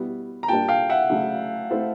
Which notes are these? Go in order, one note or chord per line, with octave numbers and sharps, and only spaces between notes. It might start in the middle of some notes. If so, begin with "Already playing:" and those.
Already playing: B2 G3 B3 E4
A#5
A#2 G3 A#3 D4 G5 A5
F5 G5
E5 F#5
C#3 F#3 A3
A3 C4 E4 A4 C5